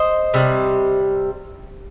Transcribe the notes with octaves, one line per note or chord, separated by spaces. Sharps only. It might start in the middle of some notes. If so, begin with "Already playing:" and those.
Already playing: C5 D#5
C3 G3